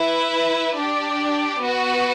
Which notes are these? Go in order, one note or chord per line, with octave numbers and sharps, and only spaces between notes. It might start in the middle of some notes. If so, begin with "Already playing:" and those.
Already playing: E4 B4 E5
D4 G4 D5
B3 F#4 B4